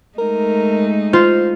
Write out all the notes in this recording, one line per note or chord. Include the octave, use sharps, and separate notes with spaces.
G#3 A3 D#4 A#4
F4 C5